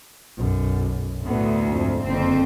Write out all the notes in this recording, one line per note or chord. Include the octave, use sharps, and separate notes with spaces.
B1 F#2
D2 A2 B3
F2 G#2
F#1 F2 D3 C4